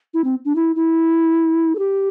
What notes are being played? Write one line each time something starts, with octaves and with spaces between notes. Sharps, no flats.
E4
C4
D4
E4
E4
A4
G4